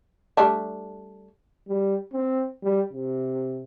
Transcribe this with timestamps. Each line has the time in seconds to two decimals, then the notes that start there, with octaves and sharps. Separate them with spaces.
0.37 G3 A3 D4
1.68 G3
2.13 C4
2.63 G3
2.92 C3